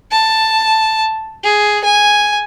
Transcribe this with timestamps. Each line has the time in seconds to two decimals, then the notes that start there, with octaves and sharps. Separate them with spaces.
0.12 A5
1.44 G#4
1.84 G#5